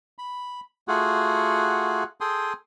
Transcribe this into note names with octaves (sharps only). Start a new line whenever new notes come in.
B5
A3 F4 F#4 G#4 F#5
G#4 A4 G5 C6 D#6